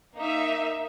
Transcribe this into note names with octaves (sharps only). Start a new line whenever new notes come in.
A#3 D#4 E5